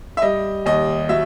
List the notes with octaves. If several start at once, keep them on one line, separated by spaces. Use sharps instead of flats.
E5
G3 D#5
D#2 D#5
F#3 E5